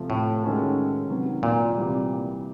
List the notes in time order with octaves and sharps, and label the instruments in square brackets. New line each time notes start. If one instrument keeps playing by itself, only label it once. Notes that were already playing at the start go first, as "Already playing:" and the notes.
Already playing: [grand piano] C3 F3 A3
[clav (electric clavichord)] A2
[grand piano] D#3 G#3 C#4 F#4 A4
C3 D#3 F#3 B3
[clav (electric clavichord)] A#2
[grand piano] C3 E3 G3